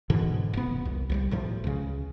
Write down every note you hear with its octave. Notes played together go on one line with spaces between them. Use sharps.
G#2 B2 D3 E3
F1 B3
C2
C2 F3 G3
B1 A2 F3
C#2 C#3